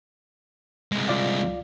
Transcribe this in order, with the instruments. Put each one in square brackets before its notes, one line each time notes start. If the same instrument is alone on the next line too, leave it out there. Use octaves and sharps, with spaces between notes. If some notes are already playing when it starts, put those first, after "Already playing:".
[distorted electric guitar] C2 G#3
[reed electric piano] F4 D5 F5